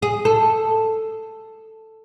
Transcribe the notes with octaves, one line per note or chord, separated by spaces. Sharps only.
G#4
A4